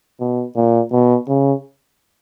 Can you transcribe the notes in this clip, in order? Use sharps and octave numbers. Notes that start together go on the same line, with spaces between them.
B2
A#2
B2
C#3